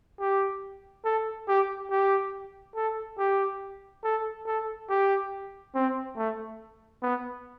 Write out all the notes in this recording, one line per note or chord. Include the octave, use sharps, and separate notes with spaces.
G4
A4
G4
G4
A4
G4
A4
A4
G4
C4
A3
B3